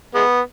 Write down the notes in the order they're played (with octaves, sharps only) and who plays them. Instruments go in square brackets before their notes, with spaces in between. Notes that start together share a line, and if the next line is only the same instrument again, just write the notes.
[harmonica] G#3 B3